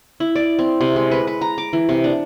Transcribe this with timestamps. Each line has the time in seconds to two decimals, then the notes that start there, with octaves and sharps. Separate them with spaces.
0.20 E4
0.35 D5
0.59 C4
0.81 C3
0.96 G#3
1.11 B4
1.27 B4
1.41 A#5
1.58 D6
1.73 E3
1.89 C3
2.04 D4